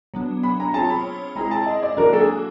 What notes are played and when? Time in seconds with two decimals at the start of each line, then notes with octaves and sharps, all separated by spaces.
0.14 F#3 B3 D4
0.43 B5
0.60 A#5
0.74 C4 F4 G#4 C#5 A5
0.90 B5
1.36 G#3 C4 E4 G#4 A#5
1.51 A5
1.66 D#5
1.83 D5
1.97 D3 F#3 A#3 D4 F#4 A#4
2.13 A4
2.21 G#4